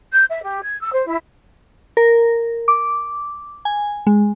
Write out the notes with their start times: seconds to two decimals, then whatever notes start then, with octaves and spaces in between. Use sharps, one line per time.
0.13 G6
0.30 E5
0.44 G4
0.63 G#6
0.81 E6
0.94 C5
1.06 E4
1.97 A#4
2.68 D6
3.65 G#5
4.07 G#3